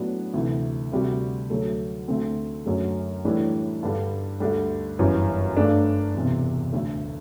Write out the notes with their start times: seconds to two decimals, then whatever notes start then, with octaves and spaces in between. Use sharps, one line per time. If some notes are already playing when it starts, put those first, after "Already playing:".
Already playing: A2 F#3 B3 D4 F#4
0.34 D2 C3 E3
0.92 D2 C3 G3 C4 F#4
1.50 D2 D3 F#3 A3
2.08 D2 D3 A3 C4
2.66 F#2 D3 F#3 A3
3.25 A2 E3 G3 D4
3.83 G2 D3 G3
4.40 D2 D3 G3
4.99 G1 F#2 E3 G3
5.57 G2 D3 A3 D4
6.15 E1 E2 C3
6.73 D2 D3 A3